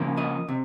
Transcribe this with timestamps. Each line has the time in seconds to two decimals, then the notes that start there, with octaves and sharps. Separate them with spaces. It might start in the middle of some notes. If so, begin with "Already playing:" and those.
Already playing: C#3 F3 A#3 C#4
0.17 D#5
0.49 C3